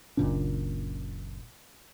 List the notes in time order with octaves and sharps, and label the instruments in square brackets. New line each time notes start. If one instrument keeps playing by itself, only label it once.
[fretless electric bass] F#1 C#2 A#2 D4